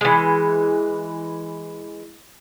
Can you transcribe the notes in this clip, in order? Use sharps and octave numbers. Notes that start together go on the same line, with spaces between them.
E3 G#3